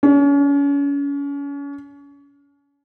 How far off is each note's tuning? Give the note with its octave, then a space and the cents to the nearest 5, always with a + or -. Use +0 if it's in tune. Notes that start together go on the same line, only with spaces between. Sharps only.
C#4 +35